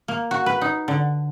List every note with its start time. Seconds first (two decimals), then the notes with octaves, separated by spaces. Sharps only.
0.08 A#3
0.31 F#4
0.46 B4
0.61 D#4
0.88 D3